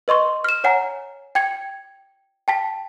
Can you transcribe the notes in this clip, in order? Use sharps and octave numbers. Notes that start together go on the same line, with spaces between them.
B4 D#5 C6 C#6
F6 E7
C#5 F#5 G#5 A#5
G5 G#6 C#7
G5 A5 B6